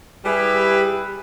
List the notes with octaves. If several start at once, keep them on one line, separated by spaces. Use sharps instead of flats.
G3 E4 G4 G#4 B4